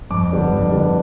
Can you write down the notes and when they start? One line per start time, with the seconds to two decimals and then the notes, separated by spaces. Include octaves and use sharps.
0.10 F2 D6
0.31 D3 G3 B3 D4
0.52 F2
0.72 D3 G3 B3 D4